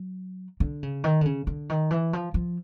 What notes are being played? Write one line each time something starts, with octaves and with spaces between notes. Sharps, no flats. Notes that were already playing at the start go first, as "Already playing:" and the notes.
Already playing: F#3
D3
C#3
D#3
D3
C#3
D3
D#3
E3
F3
F3